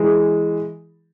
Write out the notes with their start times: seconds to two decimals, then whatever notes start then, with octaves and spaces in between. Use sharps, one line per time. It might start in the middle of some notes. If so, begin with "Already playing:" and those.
Already playing: E3 G#3